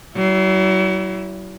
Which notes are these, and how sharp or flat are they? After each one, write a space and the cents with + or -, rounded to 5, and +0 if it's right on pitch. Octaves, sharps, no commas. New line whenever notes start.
F#3 +40 E4 +0